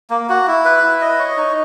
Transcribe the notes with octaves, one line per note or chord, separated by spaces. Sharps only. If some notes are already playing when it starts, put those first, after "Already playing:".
A#3
F#4
E4
B4
E4
D#5
C#5
D#4